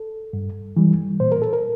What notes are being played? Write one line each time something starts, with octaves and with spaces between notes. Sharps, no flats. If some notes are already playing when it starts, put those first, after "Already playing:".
Already playing: A4
G2
E3 G3
A#2 C5
A#4
A4
A#4